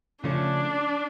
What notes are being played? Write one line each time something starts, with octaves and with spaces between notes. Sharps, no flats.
C#3 F3 A3 C#4 D4